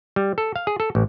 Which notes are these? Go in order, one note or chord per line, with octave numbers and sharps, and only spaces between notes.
G3
A4
F5
G#4
A4
A1